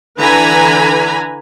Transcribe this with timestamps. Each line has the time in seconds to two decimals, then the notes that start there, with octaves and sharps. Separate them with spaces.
0.18 D3 E3 B4 G#5 A#5 B5